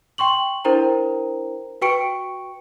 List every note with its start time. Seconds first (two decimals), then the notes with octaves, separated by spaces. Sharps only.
0.18 G5 C6 C#6 F#7
0.65 D4 E4 A#4 C5 G5 A#5
1.82 F#4 B4 G5 C#6 C#7 D7